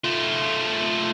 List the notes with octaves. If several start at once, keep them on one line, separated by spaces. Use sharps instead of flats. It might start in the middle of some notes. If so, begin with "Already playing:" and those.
A3 F4